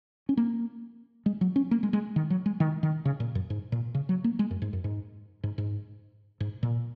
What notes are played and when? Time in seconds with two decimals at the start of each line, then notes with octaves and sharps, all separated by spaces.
0.29 C#4
0.37 A#3
1.26 G#3
1.41 F#3
1.56 C#4
1.71 A#3
1.83 G#3
1.93 G#3
2.16 D#3
2.30 F#3
2.46 G#3
2.60 D#3
2.83 D#3
3.05 C#3
3.20 A#2
3.35 F#2
3.50 G#2
3.72 A#2
3.95 C#3
4.09 F#3
4.24 A#3
4.39 G#3
4.51 F#2
4.62 G#2
4.73 F#2
4.84 G#2
5.43 G#2
5.58 G#2
6.40 G#2
6.63 A#2